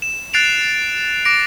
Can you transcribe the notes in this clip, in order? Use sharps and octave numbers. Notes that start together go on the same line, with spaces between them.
E7
F#6 A6 C7 D7 F7
D6 A#6 D7